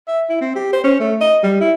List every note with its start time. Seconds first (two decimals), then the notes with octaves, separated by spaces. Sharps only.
0.08 E5
0.30 E4
0.41 C4
0.56 G4
0.73 C5
0.84 C#4
1.00 A3
1.21 D#5
1.44 G3
1.61 E4